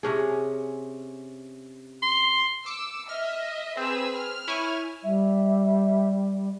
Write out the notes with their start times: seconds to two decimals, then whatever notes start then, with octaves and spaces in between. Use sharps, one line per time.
0.03 C3 C#4 G#4
2.02 C6
2.66 D6 E6 C#7
3.09 D#5 E5 F6
3.77 C4 G#4 B4 E6
4.16 F6
4.48 E4 C#5 G#5
5.04 G3 E5